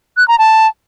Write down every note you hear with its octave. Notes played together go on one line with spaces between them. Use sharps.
F#6
A#5
A5